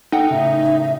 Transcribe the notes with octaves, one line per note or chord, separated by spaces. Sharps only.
D#4 A4 F#5 G5
A2 C#3 E5